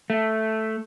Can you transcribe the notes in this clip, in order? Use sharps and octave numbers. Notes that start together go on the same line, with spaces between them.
A3